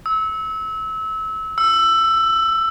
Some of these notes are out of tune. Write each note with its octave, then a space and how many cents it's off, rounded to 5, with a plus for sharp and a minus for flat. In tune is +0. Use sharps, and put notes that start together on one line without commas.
E6 -25
E6 +15